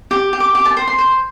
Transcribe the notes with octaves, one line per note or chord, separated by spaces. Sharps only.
G4
G4
D6
G4 D6
A5
C5
C6
C5